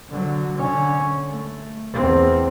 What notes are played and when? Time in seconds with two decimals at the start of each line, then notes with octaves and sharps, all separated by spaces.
0.10 D3 F#3
0.57 D3 C#4
1.30 A3
1.93 E2 C4